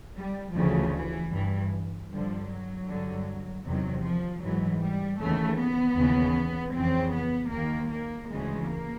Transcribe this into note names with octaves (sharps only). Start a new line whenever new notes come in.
G3
D2 C#3 E3 F3
E3
G2 E3
G2 D3 F3
F#3
G2 D3
E2 C3 D#3 F#3
F3
G#2 E3 F#3
G3
D#2 C#3 E3 A3
B3
D#2 C#3 E3
F2 C#3 E3 C4
B3
D#2 D#3 A#3
A#3
D2 C#3 E3 G#3
A#3